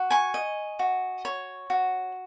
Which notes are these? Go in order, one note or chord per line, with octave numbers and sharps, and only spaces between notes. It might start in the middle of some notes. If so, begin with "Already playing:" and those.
Already playing: F#4
G#5 C#6
D#5
F#4
C#5
F#4